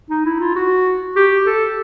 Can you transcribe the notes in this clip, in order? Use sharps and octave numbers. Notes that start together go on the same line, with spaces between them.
D#4
E4
F4
F#4
G4
A4